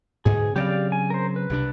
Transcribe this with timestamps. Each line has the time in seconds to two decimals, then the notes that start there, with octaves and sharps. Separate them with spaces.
0.25 G#2 B2 D3 G#4
0.56 C#3 F#3 C4 G4 D5 F5
0.92 G#5
1.10 A#4 C5
1.36 B4
1.50 C2 C3 D4